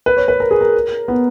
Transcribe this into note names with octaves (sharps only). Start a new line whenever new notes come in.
B4
C#5
B4
A#4
G#4
A#4
B3